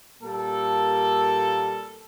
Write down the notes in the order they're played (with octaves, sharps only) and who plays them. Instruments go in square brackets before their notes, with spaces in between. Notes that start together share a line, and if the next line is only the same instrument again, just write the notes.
[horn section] A#2 G3 A#3 A4